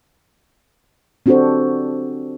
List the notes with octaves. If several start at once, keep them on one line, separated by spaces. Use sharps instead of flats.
C4 D4 F#4 G4 A4 C5